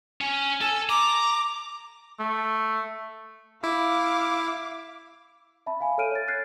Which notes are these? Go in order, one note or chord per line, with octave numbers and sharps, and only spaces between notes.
C#4
A4 G#5
A#5 D6
A3
E4 F5 D6
E5 A5 B5
F5 G#5 B5
A4 C#5 F6 D7 D#7
C#5 A6
F6 F#6 G#6 A6 C7